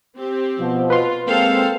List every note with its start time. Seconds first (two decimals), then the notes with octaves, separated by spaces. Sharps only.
0.17 C4 G4
0.59 B2 F3
0.90 F4 B4 C6
1.27 G#3 A#3 C4 A4 C5 F5